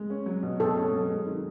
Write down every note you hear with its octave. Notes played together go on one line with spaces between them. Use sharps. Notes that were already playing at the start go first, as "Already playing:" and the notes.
Already playing: G#3
C#4
F#3
B2
B2 A4
C#4
F#3
G#3
D#3